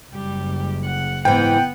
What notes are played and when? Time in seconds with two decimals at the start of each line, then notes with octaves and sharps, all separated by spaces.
0.12 F#1 G3 G4
0.85 F#5
1.25 G#2 E3 B3 F#5 G5